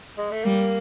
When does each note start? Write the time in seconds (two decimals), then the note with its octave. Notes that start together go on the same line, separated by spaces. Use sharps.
0.18 G#3
0.31 A3
0.44 G3 A#3